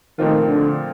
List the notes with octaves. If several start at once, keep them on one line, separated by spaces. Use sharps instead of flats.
A#2 D#3 F3 A3 C4 F4
D3